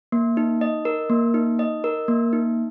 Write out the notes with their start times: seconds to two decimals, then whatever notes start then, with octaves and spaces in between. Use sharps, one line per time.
0.12 A#3
0.37 D#4
0.61 D#5
0.85 A#4
1.10 A#3
1.34 D#4
1.59 D#5
1.84 A#4
2.08 A#3
2.33 D#4